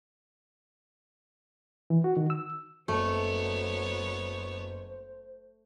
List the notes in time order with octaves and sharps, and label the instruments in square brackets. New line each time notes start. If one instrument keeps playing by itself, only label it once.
[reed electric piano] E3
F#4
D#3
E6
[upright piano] F#1 [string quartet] F#3 B3 C#5 [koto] A3 [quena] C5